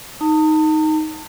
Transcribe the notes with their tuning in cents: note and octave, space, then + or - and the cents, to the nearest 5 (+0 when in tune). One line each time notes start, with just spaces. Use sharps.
D#4 +5 A5 +40